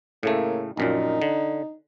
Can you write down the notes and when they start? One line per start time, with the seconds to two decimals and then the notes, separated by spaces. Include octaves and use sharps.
0.23 A2 C#3 A3 A#3
0.77 A#1 F#2 A#2 D#4
1.22 D3